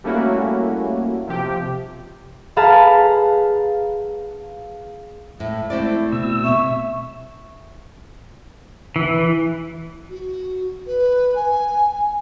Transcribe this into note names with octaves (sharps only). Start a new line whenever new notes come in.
G3 A3 A#3 C#4 E4 F#4
C3 F3 G4
G#4 B4 F5 A5 A#5
A2 E5
A3 C4 E4 D5
B2 E6
E5 C#6
E3
F#4
B4
G#5